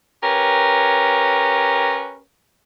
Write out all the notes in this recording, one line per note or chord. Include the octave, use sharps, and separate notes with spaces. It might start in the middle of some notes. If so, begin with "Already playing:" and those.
C#4 G4 A#4 B4 C#5